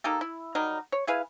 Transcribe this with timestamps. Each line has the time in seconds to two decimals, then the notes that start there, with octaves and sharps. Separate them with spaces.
0.04 A#3 D#4 G4 A4
0.21 E4
0.55 F#3 G3 D#4 A#4
0.92 C#5
1.07 E4 G#4 B4 F5